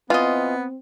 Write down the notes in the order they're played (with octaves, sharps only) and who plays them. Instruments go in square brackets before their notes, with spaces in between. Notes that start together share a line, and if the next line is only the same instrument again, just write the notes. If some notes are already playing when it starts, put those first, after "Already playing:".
[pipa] E3 D#5 [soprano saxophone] B3 [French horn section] C4 [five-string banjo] F4